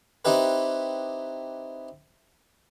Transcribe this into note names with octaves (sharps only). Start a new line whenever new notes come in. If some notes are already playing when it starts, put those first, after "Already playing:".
C4 D#4 E4 G4 B4